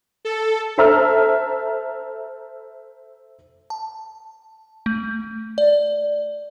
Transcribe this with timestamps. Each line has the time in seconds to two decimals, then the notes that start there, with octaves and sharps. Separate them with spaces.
0.25 A4
0.78 A4 C5 E5 A#5 E6 F6
3.70 A5
4.86 A3
5.58 D5